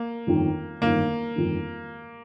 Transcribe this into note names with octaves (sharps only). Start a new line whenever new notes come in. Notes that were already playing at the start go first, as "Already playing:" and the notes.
Already playing: A#3
G1 F2 D#3
G1 F2 D#3 A#3
G1 F2 D#3